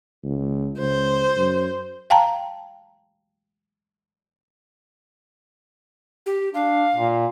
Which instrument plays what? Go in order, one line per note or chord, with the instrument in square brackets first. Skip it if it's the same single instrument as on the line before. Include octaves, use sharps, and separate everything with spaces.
[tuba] C#2
[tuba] C#2 [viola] C5
[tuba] F#2
[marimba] F5 G5 A5 A#5
[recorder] G4
[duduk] D4 [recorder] F5
[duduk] A#2